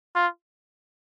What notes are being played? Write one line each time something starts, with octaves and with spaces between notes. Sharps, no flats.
F4